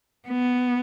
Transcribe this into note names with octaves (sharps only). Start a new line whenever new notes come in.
B3